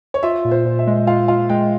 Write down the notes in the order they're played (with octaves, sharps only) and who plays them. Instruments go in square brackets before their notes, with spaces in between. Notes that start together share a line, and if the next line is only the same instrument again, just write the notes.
[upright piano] C#5
[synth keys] F4 [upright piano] E5
[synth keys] A#2
[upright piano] C5
[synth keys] A#2
[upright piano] E5
[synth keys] G#3
[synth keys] F4 [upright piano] F5
[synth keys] F4 [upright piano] F5
[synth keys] G#3 [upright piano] G5